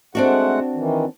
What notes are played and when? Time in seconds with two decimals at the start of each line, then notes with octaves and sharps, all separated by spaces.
0.15 G#3 A3 C4 D4 F#4 F#5
0.75 D#3 E3